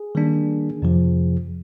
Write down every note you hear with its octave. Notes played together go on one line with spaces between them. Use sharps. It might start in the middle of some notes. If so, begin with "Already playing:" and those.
Already playing: G#4
D#3 G3 A#3 D4
F2 C3 F3